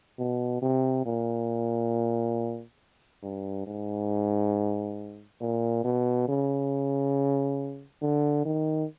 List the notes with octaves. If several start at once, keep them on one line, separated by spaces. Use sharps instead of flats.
B2
C3
A#2
G2
G#2
A#2
B2
C#3
D3
D#3